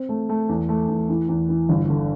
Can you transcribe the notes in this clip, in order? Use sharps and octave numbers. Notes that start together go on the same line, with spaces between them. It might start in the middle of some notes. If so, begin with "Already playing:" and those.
Already playing: C4
A3
A3
E2
A3
E2
E3
E2
E3
G1
D3